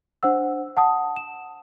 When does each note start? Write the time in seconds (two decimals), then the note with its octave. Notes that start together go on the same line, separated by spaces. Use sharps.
0.23 D4 C5 F#5 E6
0.77 F#5 A5 D#6
1.16 E7